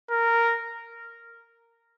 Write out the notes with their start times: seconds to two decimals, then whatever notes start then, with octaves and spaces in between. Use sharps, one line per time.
0.11 A#4